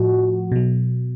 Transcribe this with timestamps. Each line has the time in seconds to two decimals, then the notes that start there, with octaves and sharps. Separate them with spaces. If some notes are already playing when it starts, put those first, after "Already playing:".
Already playing: A2 F3 F#4
0.52 B2 F#3